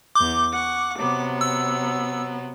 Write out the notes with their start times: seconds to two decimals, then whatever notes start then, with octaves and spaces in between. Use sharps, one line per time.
0.15 E2 D6 G6
0.52 F#5 C#6
0.98 C3 F#3 B3
1.41 E6